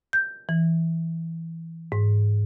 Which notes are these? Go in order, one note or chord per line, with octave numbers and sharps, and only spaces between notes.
G6
E3
G#2